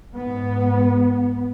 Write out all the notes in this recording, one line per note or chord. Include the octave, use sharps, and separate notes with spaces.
G#2 B3